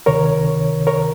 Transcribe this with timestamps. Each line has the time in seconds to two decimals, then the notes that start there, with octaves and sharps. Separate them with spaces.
0.06 C#2 C3 D#3 A#4 C#5
0.87 A#4 C#5